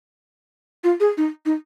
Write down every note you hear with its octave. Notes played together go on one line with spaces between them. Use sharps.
F4
G#4
D#4
D#4